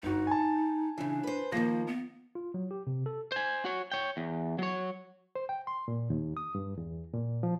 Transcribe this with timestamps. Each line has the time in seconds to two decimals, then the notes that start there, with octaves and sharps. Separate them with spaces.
0.03 G1 D#4 F#4
0.27 G#5 A5
0.98 C#3 E3 D4
1.23 B4 C5
1.52 D#3 F3 A#3 A#6
1.87 B3
2.35 F4
2.54 F#3
2.71 G4
2.87 C3
3.06 A4
3.32 C5 G#5
3.65 F#4 C#5
3.92 C#5 G5
4.17 E2
4.59 F#3 C#5
5.35 C5
5.49 G5
5.67 C6
5.88 A#2
6.10 D#2
6.37 D#6
6.55 G2
6.78 E2
7.14 A#2
7.43 F3